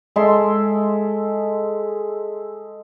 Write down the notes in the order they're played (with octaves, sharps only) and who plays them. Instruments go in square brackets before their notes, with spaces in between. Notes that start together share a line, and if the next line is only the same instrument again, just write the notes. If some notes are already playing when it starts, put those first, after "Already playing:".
[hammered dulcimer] G#3 A4 E5 C6